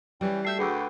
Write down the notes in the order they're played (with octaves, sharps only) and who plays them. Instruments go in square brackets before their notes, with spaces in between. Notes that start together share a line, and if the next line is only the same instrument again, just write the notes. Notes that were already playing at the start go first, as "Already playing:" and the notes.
[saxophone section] E3 [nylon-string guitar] G3 [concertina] C#4 G5
[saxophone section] A3 F#4 E5 [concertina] G5 A5 [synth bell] G6 C7
[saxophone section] D2 [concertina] F#4 B4 G5 [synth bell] G#4 D6 E6